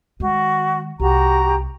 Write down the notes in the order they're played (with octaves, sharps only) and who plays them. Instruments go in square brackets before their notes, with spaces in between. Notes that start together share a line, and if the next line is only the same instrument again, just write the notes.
[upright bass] D#3 G#3 [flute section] F#4
[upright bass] C2 [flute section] F#4 G4 A#5